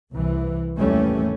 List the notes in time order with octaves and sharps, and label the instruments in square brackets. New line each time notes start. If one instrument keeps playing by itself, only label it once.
[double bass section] C2 E3
G#1 D#2 E3 G3 A3 C#4